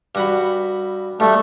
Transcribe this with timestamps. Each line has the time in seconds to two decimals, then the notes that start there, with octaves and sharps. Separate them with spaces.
0.15 G2 F#4 B5
1.20 G2 A3